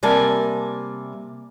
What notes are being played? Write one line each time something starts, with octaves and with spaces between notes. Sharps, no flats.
C3 G3 A#3 G#5 A5